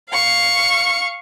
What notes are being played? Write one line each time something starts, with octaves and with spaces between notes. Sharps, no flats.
F5 C#6